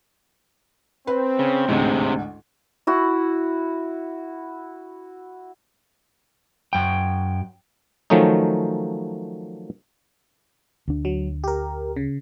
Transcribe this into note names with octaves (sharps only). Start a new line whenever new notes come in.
C4 B4
C#3
A1 D2 G#2 C3 G#3
E4 F#4
F#2 G5
D#3 F3 F#3 A3 C#4 D#4
D2 D4
F#3
G4 A#4
C#3